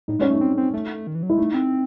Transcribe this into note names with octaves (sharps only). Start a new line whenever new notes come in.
A2 D#4
G#3 C#4
A3
D#4
C4
C4
A3
D#3
E3
F#3
G#3 E4
A3 D#4
C4